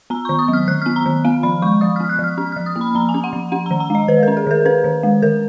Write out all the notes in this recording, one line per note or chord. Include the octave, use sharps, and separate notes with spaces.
B3 A#5
D#3 C#6
D#6
F#3
F6
D#3 F#6
B3 F6
A#5
D#3
B3 F5
F3 B5
G#3 C#6
F3 D#6
B3 F6
F#6
F3 F6
C#4 F6
F3 F6
D#6
A#3
B5
F3 A#5
G#5
C#4
F#5
F3
C#4 F#5
D#3 A#5
A#5
G#3 D#5
D#3 B4
C#4 A#4
G#4
D#3 A#4
C#4 B4
D#3
G#3
D#3 A#4